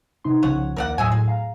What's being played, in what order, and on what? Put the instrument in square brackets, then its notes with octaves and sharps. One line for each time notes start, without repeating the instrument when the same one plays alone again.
[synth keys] C3 D#4 C6
[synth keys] C2 C#3 F3 [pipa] C#5 F#5
[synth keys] D#2 [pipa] A#4 D5 F#5
[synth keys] E2 A2 F#3 [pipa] D#5 E5 G#5
[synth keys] A2 [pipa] G#4
[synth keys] F5 A#5